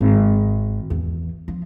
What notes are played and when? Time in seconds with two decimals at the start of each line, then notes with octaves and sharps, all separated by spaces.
0.01 G#1
0.90 E2
1.48 F3